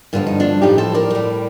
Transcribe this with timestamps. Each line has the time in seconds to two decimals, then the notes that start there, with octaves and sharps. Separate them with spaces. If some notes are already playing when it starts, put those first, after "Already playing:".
0.13 G2 D3 F3 F4
0.27 D#4
0.40 D4 F4
0.62 A2 F3 D#4 G4
0.78 A4 C5
0.94 A#4 D5
1.10 A2 G3